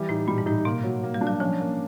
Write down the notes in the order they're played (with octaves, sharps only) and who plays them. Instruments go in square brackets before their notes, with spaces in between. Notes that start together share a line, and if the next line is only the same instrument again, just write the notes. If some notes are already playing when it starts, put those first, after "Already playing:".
Already playing: [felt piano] E3 G3
[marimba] A2 [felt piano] D#4
[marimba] A#2 [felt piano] G3
[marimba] G#2
[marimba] A2 [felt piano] D#4
[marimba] B2 [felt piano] A#3
[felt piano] F#3
A#3
[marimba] G3
[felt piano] D4
[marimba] F#3
[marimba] F3 [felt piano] C#4
[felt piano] A#3